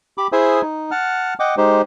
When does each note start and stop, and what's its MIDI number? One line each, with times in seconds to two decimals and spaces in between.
0.18 0.27 67
0.18 0.27 83
0.18 0.27 86
0.32 0.61 64
0.32 0.61 68
0.32 0.61 72
0.32 0.61 76
0.32 0.61 80
0.32 0.61 87
0.62 0.91 63
0.91 1.34 78
0.91 1.34 81
0.91 1.34 89
1.40 1.55 75
1.40 1.55 78
1.40 1.55 79
1.40 1.55 86
1.57 1.82 56
1.57 1.82 63
1.57 1.82 67
1.57 1.82 72